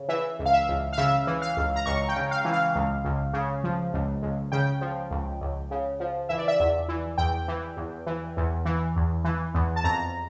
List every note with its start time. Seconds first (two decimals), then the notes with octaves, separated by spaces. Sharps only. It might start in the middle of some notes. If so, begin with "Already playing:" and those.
Already playing: C#3
0.09 E3 E5
0.39 C#2
0.46 F5
0.53 E5
0.69 C#2
0.93 F5
0.97 C#3 E5
1.27 E3
1.42 F5
1.57 C#2
1.76 A#5
1.86 C#2 C#6
2.09 G5
2.16 C#3
2.31 F5
2.45 E3
2.53 F5
2.75 C#2
3.05 C#2
3.33 C#3
3.64 F3
3.94 C#2
4.22 C#2
4.52 C#3 G5
4.81 F3
5.11 C#2
5.41 C#2
5.71 C#3
6.00 F3
6.29 E3 E5
6.38 D5
6.48 E5
6.60 E2
6.88 E3
7.18 E2 G5
7.48 E3
7.77 E2
8.07 E3
8.37 E2
8.65 E3
8.96 E2
9.25 E3
9.54 E2
9.76 A5
9.84 F2 A#5